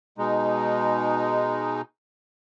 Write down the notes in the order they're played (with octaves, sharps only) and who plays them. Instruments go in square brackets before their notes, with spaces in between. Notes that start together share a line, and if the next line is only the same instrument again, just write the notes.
[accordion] B2 G#3 D#4